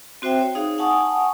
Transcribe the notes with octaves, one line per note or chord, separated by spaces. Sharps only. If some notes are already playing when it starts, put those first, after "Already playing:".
C4 F#4 C5 E5 G5
C#5
D#4 G#4 F5
F#5 G#5 A5 C#6 D#6